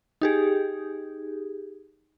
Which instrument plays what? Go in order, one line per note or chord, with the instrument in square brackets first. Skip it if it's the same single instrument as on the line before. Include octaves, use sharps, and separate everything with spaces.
[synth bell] D#4 G4 G#4